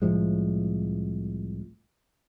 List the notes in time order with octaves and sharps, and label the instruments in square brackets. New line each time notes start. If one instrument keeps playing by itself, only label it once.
[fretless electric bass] C2 A2 F3 G#3